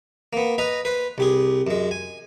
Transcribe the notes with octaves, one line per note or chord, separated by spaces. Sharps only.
A#3 B3
B4 D#5 A#5
B4 C5
C2 G4 G#4
F#2 G#3
G#5